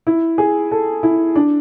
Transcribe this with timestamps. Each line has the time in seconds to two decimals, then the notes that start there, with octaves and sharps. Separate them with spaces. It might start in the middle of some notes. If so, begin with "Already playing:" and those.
0.07 E4
0.38 G#4
0.72 A4
1.03 E4
1.35 D4